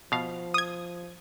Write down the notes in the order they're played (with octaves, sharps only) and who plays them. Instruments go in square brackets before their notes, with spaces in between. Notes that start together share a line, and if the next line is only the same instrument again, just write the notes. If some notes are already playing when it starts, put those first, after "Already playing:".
[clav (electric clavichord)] B2 F5 [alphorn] F3
[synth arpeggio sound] D#6 G#6